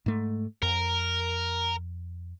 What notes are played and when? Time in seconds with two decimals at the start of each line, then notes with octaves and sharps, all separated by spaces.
0.06 G#2 A3
0.62 F2 A#4